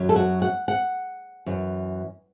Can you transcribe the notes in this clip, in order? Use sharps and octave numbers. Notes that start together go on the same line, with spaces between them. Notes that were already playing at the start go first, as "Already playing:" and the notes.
Already playing: F#2 F#3
A4
F#4
F#5
F#5
F#2 E3